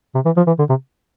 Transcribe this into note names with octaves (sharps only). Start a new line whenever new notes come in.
C3
E3
F3
E3
D3
C3